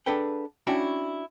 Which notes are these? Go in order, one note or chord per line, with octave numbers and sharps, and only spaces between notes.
D4 G#4 A4 B4 F#5 G5
C#4 D4 E4 F#4 G5 B5